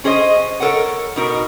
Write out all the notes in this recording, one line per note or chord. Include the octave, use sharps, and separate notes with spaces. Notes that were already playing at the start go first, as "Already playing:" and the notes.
C#4 G#4 C5 D5 D#5
A4 A#4 C#5 F#5
B2 D#4 A#4